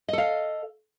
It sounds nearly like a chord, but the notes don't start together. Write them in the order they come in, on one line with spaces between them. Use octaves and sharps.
D#5 A4 F5